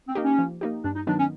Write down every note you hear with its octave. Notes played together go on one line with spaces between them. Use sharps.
C4
A#3 D#4 G4
C#4
F3
A#3 D#4 G4
G2 D4
D#4
D#3 F#3 B3 D4 D#4
C#4